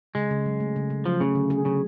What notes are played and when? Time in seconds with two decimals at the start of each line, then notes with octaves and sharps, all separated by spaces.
0.15 C#3 G#3
0.31 C#3
0.46 F#3
0.60 A3
0.76 C#3
0.90 C#3
1.06 F3 F#3
1.21 C#3 A3
1.35 D3
1.50 G#4
1.65 C#3 F#3